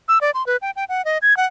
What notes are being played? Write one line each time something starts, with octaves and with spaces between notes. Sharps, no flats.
E6
D5
C6
B4
G5
G5
F#5
D#5
G#6
F#5